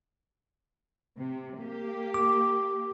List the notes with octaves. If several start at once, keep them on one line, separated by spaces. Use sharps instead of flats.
C3
A#3 G4
D6